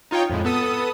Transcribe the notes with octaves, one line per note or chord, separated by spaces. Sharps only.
D#4 F4 C#5 G5
F2 A2 G#3
B3 A4 D#6